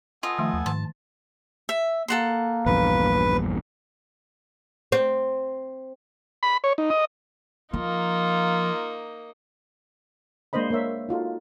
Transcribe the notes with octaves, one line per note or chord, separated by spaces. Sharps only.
B3 F4 A4 D#5 G#5
D#3 F3 A3 E5
D#2
G#2 D#3 A5
E5
A#3 A4 F#5 C6
A#1 E2 G2 B4
C4
B5
C#5
D#4
D#5
F3 A#3 D#4 F4
G#3 A#3 D4 C5 D#5 B5
A#3 A#4 C#5 E5
D#4 F4 F#4 A4